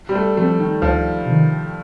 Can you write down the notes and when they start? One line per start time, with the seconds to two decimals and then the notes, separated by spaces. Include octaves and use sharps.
0.09 G3
0.15 A3
0.37 F3 A3 C4
0.59 D#3
0.82 D2 F3
1.26 C3 D#3